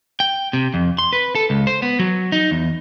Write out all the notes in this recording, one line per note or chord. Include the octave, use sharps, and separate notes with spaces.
G5
C3
F2
C6
B4
A4
C#2
C5
B3
F#3
D#4
E2